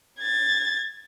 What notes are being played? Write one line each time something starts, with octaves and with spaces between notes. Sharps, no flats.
G#6 A6